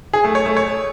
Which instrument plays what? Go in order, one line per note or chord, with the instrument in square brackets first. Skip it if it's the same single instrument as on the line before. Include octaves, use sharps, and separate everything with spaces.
[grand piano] G#4
A3
C#5
A3
C#5